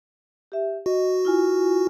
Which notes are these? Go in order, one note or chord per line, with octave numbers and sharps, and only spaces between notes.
G4 E5
F#4 D#5
E4 F4 G#5